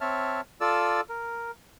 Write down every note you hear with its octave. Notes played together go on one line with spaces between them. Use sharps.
C4 C#5 E5 A5 F6
F4 A4 D5 E6
A#4